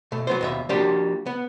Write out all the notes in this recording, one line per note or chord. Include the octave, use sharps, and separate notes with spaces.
B2 A3
F#3 B3 C5
D#2 B2 E5
F3 A#3 D4 F#4 G4
B3